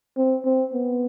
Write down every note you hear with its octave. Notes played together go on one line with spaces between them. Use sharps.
C4
C4
B3